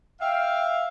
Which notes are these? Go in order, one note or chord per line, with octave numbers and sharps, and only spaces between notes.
E5 F5 G5